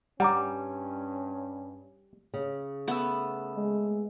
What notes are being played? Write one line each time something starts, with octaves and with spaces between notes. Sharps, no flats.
G2 G3 C#4 F#5 A#5 D6
C#3
A3 B3 E6
G#3